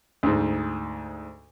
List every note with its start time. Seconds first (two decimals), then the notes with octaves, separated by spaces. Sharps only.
0.23 D2 G#2